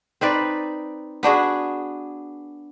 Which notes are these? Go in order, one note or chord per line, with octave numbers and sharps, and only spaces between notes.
C4 D#4 B4 D5
B3 D4 F#4 G#4